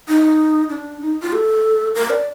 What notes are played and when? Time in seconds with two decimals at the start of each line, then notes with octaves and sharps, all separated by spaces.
0.08 D#4
0.70 D4
1.02 D#4
1.22 F4
1.33 A4
1.95 A#4
2.10 D5